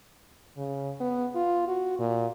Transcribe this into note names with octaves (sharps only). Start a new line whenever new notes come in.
C#3
B3
F4
F#4
A#2